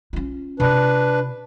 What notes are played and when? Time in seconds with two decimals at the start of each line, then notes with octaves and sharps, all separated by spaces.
0.13 C#4 F4
0.60 C3 D4 F4 B4